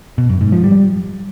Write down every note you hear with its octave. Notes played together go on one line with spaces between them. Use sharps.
B2
F#2
G#2
F3
G3